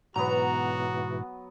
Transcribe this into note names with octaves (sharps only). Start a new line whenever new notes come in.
G#2 B2 E3 F#3 B3 F#4 A#5